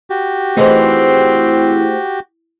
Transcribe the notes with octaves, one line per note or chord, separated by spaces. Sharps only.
F#4 G4
E3 A3 C4 D#4 G#4 C5